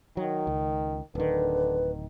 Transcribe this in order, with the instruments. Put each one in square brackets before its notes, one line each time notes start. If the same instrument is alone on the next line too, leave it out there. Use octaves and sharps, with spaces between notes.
[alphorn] D#3 [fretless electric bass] F#3
[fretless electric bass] C#2
[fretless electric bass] D1 D#3 [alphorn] D3 [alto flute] B4